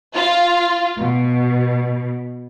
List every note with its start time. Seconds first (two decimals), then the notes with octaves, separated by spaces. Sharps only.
0.14 F4
0.98 B2